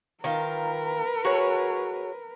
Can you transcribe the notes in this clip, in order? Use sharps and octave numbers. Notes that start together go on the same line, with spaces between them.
D#3 F4 A#4 B4
F#4 G#4 C#5